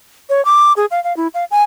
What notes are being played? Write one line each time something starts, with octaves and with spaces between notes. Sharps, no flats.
C#5
D6
G#4
F5
F5
E4
F5
G#5